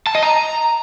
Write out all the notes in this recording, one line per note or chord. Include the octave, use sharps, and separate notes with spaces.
A5
D#5
A#5